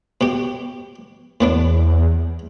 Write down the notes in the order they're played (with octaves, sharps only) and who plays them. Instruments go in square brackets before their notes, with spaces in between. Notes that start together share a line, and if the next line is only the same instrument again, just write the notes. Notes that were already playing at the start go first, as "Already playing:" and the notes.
[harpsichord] B2 G4
[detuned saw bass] E2 [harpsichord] A2 B3 D4